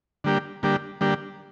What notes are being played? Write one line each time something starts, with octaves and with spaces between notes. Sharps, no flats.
D3 G3 A#3 D4 G4
D3 G3 A#3 D4 G4
D3 G3 A#3 D4 G4